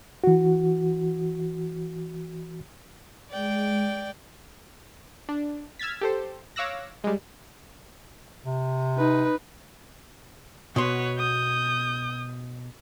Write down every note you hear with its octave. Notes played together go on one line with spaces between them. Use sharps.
E3 F#4
G#3 D5 G5
D4
E6 F6 G#6 A6 B6
G4 A4 C5
C#5 F5 D6 E6 F#6 A#6
G3 G#3
C3
D#4 B4
B2 F#4 B4 C#5 C6
D#6 G6